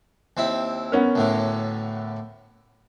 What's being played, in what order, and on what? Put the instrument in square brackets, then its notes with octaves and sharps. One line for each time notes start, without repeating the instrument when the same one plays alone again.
[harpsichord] D#2 C4 E4
[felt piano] B3 C#4 A#4
[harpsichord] D2 A2 D3